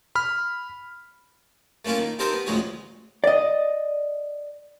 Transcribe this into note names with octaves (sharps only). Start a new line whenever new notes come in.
B5 F6
A3 A#3 C#4 E4 F4
D#3
C4 D#4 G4 A4 A#4 C5
B3
A1 D2 F3 G#3 G#4 C#5
D5 D#5